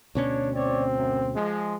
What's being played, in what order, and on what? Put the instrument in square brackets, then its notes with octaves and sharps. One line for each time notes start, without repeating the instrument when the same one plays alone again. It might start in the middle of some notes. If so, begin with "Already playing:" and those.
[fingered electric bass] D2 B2 C#4 [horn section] D4 C#5
[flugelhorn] C4 [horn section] C#5 D5
[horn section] F#2
F3 G#3